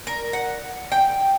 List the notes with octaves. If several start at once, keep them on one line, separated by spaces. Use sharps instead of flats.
A#4
F#5
G5